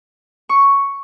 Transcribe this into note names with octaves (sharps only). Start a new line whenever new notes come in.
C#6